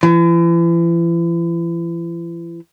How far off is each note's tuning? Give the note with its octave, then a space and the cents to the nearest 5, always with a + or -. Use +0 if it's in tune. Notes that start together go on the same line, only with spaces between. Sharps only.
E3 +40